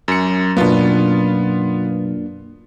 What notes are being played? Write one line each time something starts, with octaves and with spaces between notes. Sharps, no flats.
F#2 C#7
F#2 B2 A#3 B3 D4 F4